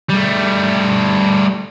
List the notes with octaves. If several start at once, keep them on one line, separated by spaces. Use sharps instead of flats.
G3 A3